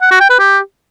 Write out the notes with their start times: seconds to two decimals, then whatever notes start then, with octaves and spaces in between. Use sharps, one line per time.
0.01 F#5
0.11 F#4
0.20 G5
0.30 B4
0.39 G4